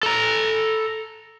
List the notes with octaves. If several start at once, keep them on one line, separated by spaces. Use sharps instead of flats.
A4 A#5